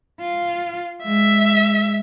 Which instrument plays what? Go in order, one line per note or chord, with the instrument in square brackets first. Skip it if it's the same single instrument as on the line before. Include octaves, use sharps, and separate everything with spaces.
[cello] F4
[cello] G#3 [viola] E5